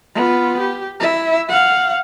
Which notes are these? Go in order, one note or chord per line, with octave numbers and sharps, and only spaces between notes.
B3 F4
G4
E4 E5
F5 F#5